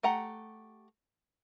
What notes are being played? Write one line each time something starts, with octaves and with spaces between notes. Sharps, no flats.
A3 G4 F#5 A#5